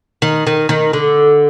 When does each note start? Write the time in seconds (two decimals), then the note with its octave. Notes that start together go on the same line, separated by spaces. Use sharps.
0.22 D#3
0.47 D#3
0.69 D#3
0.93 D3